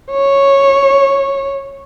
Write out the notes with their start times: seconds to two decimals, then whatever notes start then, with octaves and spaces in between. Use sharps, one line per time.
0.12 C#5